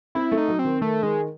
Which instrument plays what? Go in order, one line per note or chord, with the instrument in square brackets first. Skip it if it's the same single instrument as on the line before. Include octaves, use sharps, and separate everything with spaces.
[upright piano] C4 [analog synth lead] E4
[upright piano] A3
[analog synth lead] D#4
[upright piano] F#3
[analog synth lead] C4
[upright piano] D#3
[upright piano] D#3 [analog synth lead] A3
[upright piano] D#3 [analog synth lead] G#3